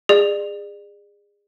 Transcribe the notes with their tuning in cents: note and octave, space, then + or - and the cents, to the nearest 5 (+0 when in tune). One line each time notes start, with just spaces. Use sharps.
G#4 -25 D5 +30